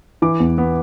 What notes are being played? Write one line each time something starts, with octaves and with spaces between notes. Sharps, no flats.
E3 D6
E2
B3